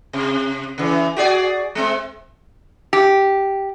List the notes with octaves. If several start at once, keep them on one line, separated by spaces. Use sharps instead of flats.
C3
C#3 E3
F#4 G#4 D5
G#3 C4
G4